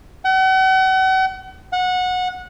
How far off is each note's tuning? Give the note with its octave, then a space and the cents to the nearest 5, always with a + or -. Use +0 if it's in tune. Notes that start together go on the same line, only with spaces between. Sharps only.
F#5 +40
F#5 -20